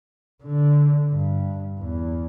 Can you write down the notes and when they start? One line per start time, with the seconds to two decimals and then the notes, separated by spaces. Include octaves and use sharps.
0.43 D3
1.11 G2
1.79 E2